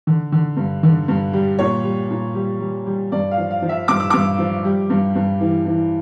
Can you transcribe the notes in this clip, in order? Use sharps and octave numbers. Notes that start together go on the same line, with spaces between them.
D3
D3
G2
D3
G2
G3
A#2 C#5
G3
A#2
G3
G3
G3
G2 D5
F5
F3
F5
F3
E5
G2 D6
E6
G2 D6
F3
G3
G2
G2
E3
E3